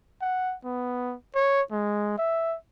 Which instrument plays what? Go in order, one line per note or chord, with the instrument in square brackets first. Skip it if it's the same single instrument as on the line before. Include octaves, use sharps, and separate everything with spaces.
[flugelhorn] F#5
B3
C#5
G#3
E5